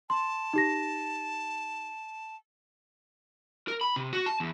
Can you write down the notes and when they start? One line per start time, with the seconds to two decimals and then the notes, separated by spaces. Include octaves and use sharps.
0.10 A5 C6
0.53 D#4 G4 A#6
3.68 A#4
3.81 B5
3.96 C3
4.13 F#4
4.26 A5
4.40 E2